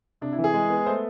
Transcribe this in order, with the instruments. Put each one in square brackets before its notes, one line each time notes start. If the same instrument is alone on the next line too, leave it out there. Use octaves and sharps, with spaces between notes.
[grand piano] C3 D4
E4
E3
G#4
G#3
B3
A3 C5